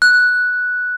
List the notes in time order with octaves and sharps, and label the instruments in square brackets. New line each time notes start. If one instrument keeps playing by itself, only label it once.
[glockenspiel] F#6